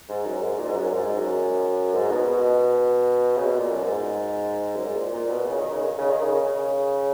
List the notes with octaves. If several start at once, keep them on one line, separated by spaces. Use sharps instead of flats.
G#2
F#2
G#2
A#2
G#2
F#2
G#2
F#2
G#2
B2
B2
B2
C#3
B2
A#2
F#2
G#2
F#2
G#2
A#2
A#2
B2
C#3
D#3
C#3
D#3
C#3
D#3
C#3
C#3